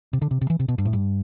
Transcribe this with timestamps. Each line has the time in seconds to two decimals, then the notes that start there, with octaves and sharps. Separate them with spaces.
0.13 C3
0.22 D3
0.31 C3
0.41 C3
0.50 E3
0.60 C3
0.68 B2
0.78 G2
0.85 A2
0.93 G2